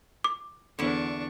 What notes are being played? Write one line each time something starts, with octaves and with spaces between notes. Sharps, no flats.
D6
E2 D3 D4 E4 C#6